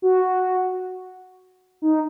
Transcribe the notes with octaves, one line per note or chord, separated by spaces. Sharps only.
F#4
D#4